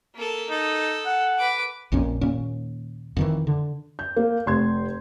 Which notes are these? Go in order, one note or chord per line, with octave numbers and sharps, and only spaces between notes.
A#3 A4
D#4 A4
F#5
B4 D6
A#1 F2 A#2 C#4
D#2 A#2 C#4
F2 D#3 E3
D3
G6
A#3
F1 C6 G#6